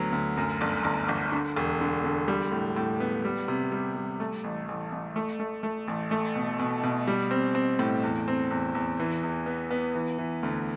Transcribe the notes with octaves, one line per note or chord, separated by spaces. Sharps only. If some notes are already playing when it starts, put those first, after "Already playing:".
Already playing: D2 F#3 B3
D2
F#2
G1
G1
G1
D3
E1
D3
D3
G3
A2
A2
B3
G3
C3
G3
G3
A3
A1
A1
A1
A3
A3
A3
A1
A3
B2
B2
B2
G3
C4
C4
A2
E2
C4
E2
E2
E3
E2
B3
B3
E3
E3
D2